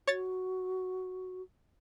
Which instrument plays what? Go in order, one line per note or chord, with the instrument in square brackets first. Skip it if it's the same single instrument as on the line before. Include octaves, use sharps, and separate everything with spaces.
[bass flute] F#4 [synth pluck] C#5 A6